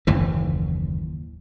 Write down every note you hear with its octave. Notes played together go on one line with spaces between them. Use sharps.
F#1 D#2 A2 E3